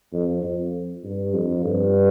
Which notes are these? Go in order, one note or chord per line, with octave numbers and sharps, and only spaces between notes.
F2
F2
G2
F2
G2